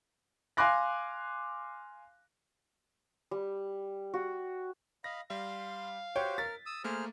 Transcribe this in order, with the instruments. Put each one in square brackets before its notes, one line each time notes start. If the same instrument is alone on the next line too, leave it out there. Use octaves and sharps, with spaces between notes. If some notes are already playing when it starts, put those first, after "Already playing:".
[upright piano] F5 G#5 C6 D6 F#6 A#6
[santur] G3
F#4
[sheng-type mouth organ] D#5 F5 B5 [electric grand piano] A#6
[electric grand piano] G3 [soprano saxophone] F5 [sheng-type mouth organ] C6
[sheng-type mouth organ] F#4 G4 C5 [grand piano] C#5 [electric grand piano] G5
[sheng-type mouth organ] A#4 [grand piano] A6 [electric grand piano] B6
[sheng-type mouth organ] D#6 E6
[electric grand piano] A3 A#3 A#4 [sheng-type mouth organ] G#4 C5 F6